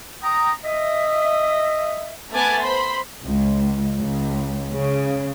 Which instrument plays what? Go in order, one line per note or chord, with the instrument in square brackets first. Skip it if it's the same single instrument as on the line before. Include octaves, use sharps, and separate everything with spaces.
[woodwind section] G5 A#5 D#6
D#5 E5
[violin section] A3 B3 G#5 D6 F#6 A6
C5 B5 C6
[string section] C#2
C#2
C#3